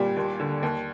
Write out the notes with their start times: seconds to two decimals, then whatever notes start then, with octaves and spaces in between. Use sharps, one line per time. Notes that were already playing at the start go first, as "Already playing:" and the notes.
Already playing: A#2 G3
0.16 D#2
0.40 D3
0.63 D#2